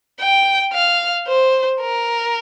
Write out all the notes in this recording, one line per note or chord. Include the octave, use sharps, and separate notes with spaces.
G5
F5
C5
A#4